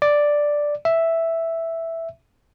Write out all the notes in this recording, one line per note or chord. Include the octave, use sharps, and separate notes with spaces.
D5
E5